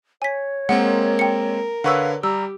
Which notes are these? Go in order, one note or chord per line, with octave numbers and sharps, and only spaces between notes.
C#5 G#5 B6
G#3 A#3 C4 A#4 F#5
G5 C#7
D3 B4 C#5 F5 F#5 C#6 E6
G3 G4 A#5 E6